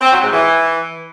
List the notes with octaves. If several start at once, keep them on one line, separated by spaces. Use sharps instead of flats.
C4
F#3
G#2
E3